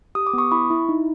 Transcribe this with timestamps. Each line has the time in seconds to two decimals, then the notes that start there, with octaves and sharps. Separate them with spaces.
0.15 G4 D#6
0.27 D6
0.33 B3 C#6 D#6
0.52 E4 B5 C#6
0.70 E4
0.89 D#4